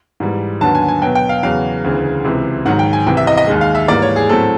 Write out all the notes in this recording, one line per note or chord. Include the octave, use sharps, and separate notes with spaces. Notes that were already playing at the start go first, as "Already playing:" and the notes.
G#2 E3 G3
D#2 D3 F#3 B3 A5
G#5
G#5
B2 F#3 B3 G5
G5
F5
E2 C#3 F#3 F5
D2 C#3 E3
C#2 C3 E3
G#2 D#3 F#3 F#5
G5
G#5
C2 C3 E3 G5
E5
D#5
D#5
D#2 D#3 G#3
F5
E5
G#2 E3 G3 A#3 D5
C#5
G#4
A2 F#3 A3 C4 A4